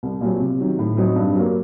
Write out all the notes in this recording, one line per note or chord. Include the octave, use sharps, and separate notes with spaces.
C2
A#2 F#3 C4
C3
D#3 F#3
A2
F#3 C4 D#4
G2
F#3 A#3